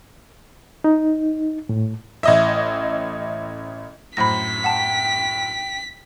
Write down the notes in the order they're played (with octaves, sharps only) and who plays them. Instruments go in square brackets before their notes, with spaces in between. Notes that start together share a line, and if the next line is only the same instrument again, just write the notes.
[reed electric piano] D#4
A2
[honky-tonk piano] A1 D#5 E5
[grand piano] F#2 A2 C5 [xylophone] B5 A#6 [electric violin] B6
[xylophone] F#5 A5 [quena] G5